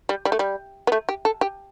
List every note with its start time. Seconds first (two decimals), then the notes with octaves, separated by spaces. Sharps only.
0.09 G3
0.25 G3
0.32 A3
0.39 G3
0.87 B3
0.92 A3
1.09 G4
1.25 A4
1.41 G4